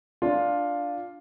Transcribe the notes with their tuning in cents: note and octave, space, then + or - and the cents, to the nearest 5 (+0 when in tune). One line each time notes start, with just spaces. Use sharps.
D4 -5 F4 +5